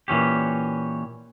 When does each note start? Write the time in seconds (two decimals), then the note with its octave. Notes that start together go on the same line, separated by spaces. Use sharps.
0.08 A#2 E3 C#4 G4